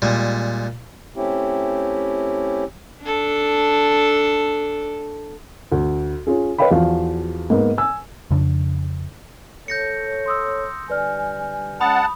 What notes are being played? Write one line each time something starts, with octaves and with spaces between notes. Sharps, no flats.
A#2 G3 G#3
A3 C4 C#4 E4 G4
D4 A4
D2
C#4 F4 G#4
B4 C#5 D#5 F5 G5 B5
E2 F3 F#4 F5
G#2 A#3 B3
G#5 E6
F2 C#3 D4
A4 C#5 G6 A#6 C#7
C6 D#6 E6
D3 G3 B4 D5 G#5 F6
G#3 C#4 F#5 A5 B5 D#6